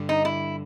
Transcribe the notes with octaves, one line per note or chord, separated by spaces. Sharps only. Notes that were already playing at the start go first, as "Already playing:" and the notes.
Already playing: G2 D3 G3
D#4
E4